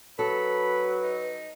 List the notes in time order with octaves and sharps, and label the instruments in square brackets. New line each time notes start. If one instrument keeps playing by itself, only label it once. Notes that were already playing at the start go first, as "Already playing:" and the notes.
[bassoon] F#3 [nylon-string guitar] A4 [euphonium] B4 [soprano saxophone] B5
[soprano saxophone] D#4